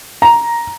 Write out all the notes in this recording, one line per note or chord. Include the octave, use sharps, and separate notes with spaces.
A#5